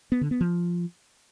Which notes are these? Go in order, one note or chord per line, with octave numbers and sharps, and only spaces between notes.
B3
D3
B3
F3